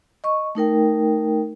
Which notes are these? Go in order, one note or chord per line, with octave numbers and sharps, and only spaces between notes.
D#5 C#6
A3 D#4 A#4 G5